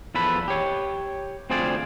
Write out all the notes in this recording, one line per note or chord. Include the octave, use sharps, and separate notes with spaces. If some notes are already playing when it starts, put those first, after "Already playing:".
E2 F3 A4 B4 B5
G4 C#5
D2 C4 F4 G#4 C5 D5